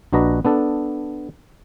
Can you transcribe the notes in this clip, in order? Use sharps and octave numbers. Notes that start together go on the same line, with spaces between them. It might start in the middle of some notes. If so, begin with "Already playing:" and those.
A#1 D4 F#4 B4 D#5 A#5
B3 D4 A4